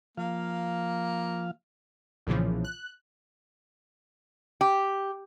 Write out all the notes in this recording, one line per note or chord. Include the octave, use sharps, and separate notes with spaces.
F3 A#3 F5
B1 A#2 C#3 E3 F3
F#6
G4